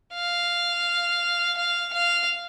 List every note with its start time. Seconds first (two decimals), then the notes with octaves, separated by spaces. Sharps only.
0.14 F5
1.57 F5
1.93 F5